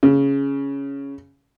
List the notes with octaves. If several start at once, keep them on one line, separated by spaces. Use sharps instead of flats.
C#3